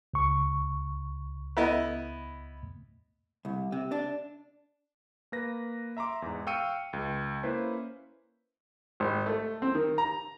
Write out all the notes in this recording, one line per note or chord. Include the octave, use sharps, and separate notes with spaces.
C#2 C#6
B3 E4 D#5
C2
C3
D4
A#3 B4 A#6
E5 A#5 C6 D6
E2 G#2
F5 G5 C#6 E6 C#7 D#7
C#2
A#3 C#4 E4 B4 C5
G#1
A3
C4
D#3
A#5